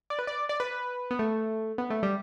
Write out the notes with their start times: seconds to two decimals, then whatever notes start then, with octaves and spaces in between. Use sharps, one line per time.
0.10 D5
0.19 B4
0.27 D5
0.49 D5
0.60 B4
1.11 B3
1.19 A3
1.78 B3
1.90 A3
2.03 G3